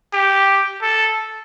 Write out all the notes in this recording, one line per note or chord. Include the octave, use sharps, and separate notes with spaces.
G4
A4